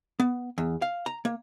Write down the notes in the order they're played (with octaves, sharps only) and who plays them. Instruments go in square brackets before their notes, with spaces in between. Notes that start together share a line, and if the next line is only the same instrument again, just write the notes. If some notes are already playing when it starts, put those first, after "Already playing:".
[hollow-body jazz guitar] B3
E2
F5
A#5
A#3